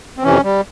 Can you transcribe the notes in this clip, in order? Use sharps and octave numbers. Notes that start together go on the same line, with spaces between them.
C4
F2 C3 E3 C#4
G3